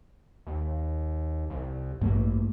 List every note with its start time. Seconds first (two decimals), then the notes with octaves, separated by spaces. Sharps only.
0.47 D#2
1.50 C2
2.01 A1 G2 A3 A#3